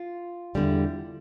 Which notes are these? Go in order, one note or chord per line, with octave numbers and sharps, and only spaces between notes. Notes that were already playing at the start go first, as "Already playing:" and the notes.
Already playing: F4
E2 D3 G3